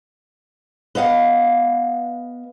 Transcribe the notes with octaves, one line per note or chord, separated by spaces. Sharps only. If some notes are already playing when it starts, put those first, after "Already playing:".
B3 D#5 F5 F#5